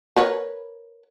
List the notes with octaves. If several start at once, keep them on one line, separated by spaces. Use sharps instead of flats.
A#4 B4 C#5